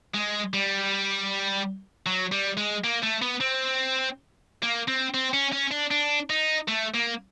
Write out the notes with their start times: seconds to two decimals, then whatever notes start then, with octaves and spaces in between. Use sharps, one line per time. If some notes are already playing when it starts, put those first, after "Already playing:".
0.14 G#3
0.53 G3
2.06 F#3
2.32 G3
2.57 G#3
2.84 A#3
3.03 A3
3.22 B3
3.40 C4
4.63 A#3
4.88 C4
5.14 C4
5.33 C#4
5.53 C#4
5.71 D4
5.91 D4
6.30 D#4
6.68 A3
6.94 A#3